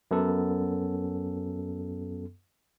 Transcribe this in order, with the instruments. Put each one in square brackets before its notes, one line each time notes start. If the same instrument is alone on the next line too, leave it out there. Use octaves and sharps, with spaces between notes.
[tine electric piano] F#2 B3 A4